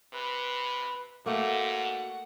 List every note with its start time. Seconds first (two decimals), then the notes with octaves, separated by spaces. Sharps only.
0.13 C3 B4
1.26 G#2 A3 A#3 F#4 F#5